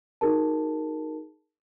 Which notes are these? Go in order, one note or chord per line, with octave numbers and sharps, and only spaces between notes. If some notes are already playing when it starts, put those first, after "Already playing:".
D#4 F#4 G#4 A#4 A5